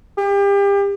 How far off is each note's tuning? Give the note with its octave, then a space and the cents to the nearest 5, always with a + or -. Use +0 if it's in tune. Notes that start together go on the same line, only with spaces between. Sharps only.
G4 +35